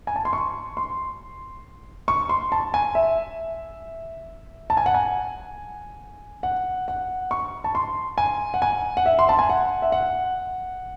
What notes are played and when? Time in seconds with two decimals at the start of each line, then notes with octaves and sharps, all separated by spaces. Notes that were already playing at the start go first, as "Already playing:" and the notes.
0.07 G#5
0.16 A5
0.25 C6
0.33 C#6
0.77 C6
2.08 C#6
2.29 C6
2.52 A5
2.74 G#5
2.95 E5
4.70 A5
4.77 G#5
4.86 F#5
4.94 G#5
6.43 F#5
6.88 F#5
7.31 C#6
7.64 A5
7.75 C6
8.18 G#5
8.54 F#5
8.62 G#5
8.97 F#5
9.06 E5
9.19 C6
9.29 A5
9.39 G#5
9.50 F#5
9.82 E5
9.92 F#5